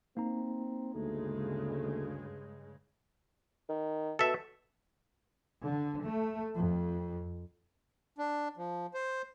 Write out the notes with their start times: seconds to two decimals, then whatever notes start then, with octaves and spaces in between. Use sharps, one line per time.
0.17 A#3 C4 D#4 A#5
0.95 D2 G2 C#3 G#3 A3
3.69 D#3
4.19 B2 A4 E5
5.63 D3
6.04 A3
6.56 F2
8.18 D4
8.57 F3
8.94 C5